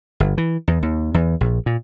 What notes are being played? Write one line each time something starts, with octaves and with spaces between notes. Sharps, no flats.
G1
E3
E2
D#2
E2
A#1
A#2